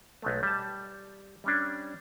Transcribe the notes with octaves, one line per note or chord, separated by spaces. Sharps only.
B1 G#3 A3
G3 A5
G3 C#4 D4